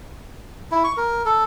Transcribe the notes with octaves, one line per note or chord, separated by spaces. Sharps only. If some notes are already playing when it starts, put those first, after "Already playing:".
E4
C#6
A#4
A4